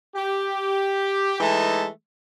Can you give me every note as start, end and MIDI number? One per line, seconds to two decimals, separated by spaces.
0.15 1.37 67
1.40 1.87 52
1.40 1.87 56
1.40 1.87 57
1.40 1.87 63
1.40 1.87 81